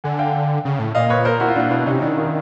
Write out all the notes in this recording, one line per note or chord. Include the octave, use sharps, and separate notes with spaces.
D3 F#5 G#5
F5 G5
C#3
A2
A#2 D#5 F5
B4 C#5
A#4 C5
E4 F#4
F4
A#2 D4 E4
B2 D4 E4
C3 C#4 D#4
D#3 D4 E4
F4
E4